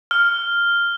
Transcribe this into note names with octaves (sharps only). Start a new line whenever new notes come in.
F6